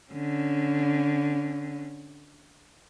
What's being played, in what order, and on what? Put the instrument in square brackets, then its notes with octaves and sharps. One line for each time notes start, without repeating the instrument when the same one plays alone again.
[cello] D3 C#4